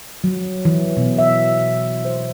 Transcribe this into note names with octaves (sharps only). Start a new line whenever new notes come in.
F#3
E3
B2
E5
C5